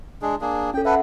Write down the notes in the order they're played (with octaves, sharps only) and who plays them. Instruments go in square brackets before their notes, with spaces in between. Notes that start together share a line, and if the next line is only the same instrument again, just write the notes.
[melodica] G#3 D4 G#4
A#3 D4 G#4
[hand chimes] C#4 A4 [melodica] G5
[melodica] A4 B4 [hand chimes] E5 F#5